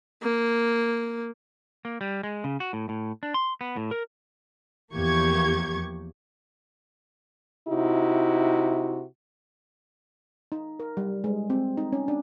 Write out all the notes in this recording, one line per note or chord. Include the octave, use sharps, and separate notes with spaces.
A#3
A#3
G3
G#3
C#3
F#4
A2
A2
D4
C6
B3
A2
A#4
E2 F3 A#3 G4 C#6 G#6
C3 D#4 E4 F#4
D#4
A#4
G3
G#3
C4
D#4
C#4
D4